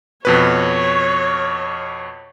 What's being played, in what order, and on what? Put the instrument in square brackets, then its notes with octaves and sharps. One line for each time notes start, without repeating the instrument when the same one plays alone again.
[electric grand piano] F2 B2 B4 [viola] C#5